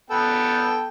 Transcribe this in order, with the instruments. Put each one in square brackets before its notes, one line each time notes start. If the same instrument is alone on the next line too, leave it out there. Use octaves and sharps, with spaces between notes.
[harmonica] B3 A4 G5